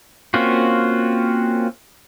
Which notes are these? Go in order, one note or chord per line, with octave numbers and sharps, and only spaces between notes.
A#3 C4 C#4 F4 F#4